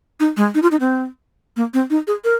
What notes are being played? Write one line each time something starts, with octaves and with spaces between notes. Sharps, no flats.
D#4
G#3
D#4
F4
D#4
C4
A#3
C4
D#4
G#4
A#4